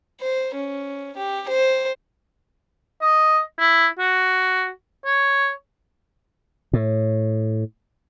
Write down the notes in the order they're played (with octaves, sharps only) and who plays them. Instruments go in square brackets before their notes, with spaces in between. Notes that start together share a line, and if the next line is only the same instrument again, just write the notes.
[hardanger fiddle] C5
C#4
G4
C5
[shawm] D#5
E4
F#4
C#5
[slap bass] A2